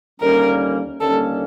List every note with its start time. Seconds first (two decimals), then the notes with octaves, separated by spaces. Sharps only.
0.20 D#2 D3 G3 A#3 C#4 A#4
1.00 D#2 D3 G3 A#3 C#4 A4